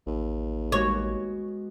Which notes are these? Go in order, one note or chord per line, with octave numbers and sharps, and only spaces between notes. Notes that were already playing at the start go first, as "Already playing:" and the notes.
A1 D#2
G#3 B3 F#4 C#5